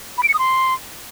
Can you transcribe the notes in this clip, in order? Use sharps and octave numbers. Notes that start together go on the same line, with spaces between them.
B5
D7
C#7
D#6
C6